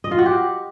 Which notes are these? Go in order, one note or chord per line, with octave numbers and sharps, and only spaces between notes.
D#5
F4
F#4
G4